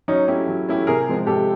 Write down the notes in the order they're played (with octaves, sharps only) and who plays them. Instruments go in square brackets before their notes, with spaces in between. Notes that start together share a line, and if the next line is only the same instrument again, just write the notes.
[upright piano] F#3 [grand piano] C#4 D#4
[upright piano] A3 C#4 E4 G4
F#3
A3 C#4 E4 G4
[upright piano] C3 [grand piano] G#4 A#4
[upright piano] F3 G#3 C4
[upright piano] C3 [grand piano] G4 A4